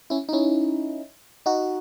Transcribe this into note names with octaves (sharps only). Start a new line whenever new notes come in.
C#4 E4
D#4
C#4 E4
D#4 F#4